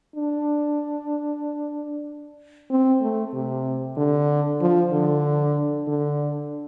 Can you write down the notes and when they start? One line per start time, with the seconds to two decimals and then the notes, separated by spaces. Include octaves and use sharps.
0.16 D4
2.71 C4
3.01 A3
3.33 C3
3.97 D3
4.61 F3
4.93 D3
5.88 D3